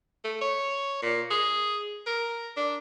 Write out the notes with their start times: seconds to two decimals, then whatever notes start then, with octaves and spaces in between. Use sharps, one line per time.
0.24 A3
0.41 C#5
1.02 A#2
1.30 G#4
2.06 A#4
2.56 D4